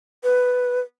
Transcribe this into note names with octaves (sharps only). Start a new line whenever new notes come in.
B4